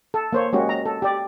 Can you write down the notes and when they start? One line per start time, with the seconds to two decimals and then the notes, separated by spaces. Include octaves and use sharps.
0.14 A4
0.33 A#3 C5 C#5
0.53 G#3 A#3 C#4 F#4 G4
0.69 A#5
0.86 A4
1.02 G4 D5